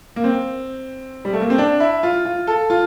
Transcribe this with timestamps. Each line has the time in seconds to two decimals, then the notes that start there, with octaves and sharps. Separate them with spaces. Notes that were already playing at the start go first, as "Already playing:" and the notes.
0.16 A#3
0.24 C4
1.25 G3
1.33 A3
1.41 A#3
1.50 C4
1.58 D4
1.80 E4
2.03 F4
2.25 F4
2.47 A4
2.70 F4